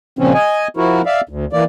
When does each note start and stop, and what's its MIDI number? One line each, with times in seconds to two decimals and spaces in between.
0.19 0.33 46
0.19 0.33 49
0.19 0.33 53
0.19 0.33 60
0.19 0.33 61
0.34 0.68 75
0.34 0.68 80
0.77 1.02 53
0.77 1.02 64
0.77 1.02 66
0.77 1.02 70
1.06 1.21 74
1.06 1.21 76
1.06 1.21 77
1.29 1.45 38
1.53 1.64 52
1.53 1.64 58
1.53 1.64 74